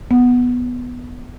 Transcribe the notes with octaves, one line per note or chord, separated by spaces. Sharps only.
B3